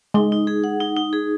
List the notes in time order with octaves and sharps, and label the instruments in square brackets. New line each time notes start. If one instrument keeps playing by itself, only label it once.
[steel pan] G#3 [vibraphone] D#4
[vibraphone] D#4
G#4
F#5
D#4
D#4
G#4